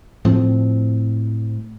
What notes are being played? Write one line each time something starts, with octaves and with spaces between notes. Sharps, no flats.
A2 F3 C4